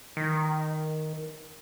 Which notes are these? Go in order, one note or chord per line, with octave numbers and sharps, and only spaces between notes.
D#3